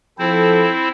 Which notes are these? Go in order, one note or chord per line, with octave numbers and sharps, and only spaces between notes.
F3 C4 E4 A4 C5